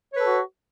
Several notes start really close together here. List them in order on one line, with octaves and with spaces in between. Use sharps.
C#5 B4 A4 F#4